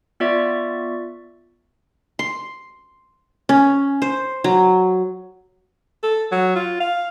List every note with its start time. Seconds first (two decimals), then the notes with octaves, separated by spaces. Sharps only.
0.20 B3 F4 D5 E5 C#6
2.19 C6
3.49 C#4
4.02 C5
4.44 F#3
6.03 A4
6.32 F#3
6.56 F4
6.80 F5